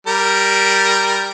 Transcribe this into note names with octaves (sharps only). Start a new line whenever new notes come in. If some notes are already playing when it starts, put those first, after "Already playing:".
G3 A#4